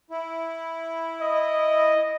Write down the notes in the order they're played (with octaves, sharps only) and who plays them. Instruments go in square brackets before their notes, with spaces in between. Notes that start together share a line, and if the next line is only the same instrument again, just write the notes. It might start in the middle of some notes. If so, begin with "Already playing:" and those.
[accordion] E4
[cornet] D#5